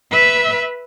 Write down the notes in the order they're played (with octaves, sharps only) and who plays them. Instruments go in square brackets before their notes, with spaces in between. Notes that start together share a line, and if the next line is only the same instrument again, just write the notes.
[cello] B4 E5